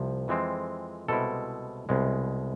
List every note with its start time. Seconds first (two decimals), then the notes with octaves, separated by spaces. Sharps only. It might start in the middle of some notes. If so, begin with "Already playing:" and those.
Already playing: C2 C3 F3
0.28 F2 E3 G#3 C4
1.08 C2 B2 G#3 C4 E4 A4
1.89 C2 B2 G#3